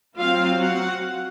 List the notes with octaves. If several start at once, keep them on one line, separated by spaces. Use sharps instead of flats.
F#3 C4 F4 F5
F#4 F#5